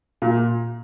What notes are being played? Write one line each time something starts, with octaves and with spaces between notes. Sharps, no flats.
A#2